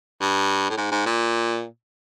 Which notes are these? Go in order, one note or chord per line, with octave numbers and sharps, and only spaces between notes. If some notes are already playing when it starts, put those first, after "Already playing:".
G2
A2
G#2
G#2
A#2